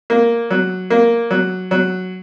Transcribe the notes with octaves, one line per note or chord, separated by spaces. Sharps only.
A#3
F#3
A#3
F#3
F#3